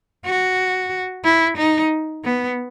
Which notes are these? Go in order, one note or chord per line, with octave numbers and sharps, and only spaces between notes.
F#4
E4
D#4
B3